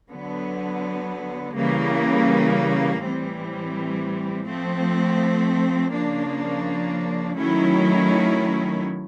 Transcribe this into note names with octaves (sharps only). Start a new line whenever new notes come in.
D3 F#3 B3
C#3 E3 G3 A#3
A2 E3 G3 C4
F3 A3 C4
C#3 F3 A#3 D4
D#3 F#3 A3 C#4 E4